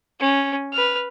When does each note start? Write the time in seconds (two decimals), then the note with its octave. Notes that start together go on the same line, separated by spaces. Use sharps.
0.20 C#4
0.73 B4 F6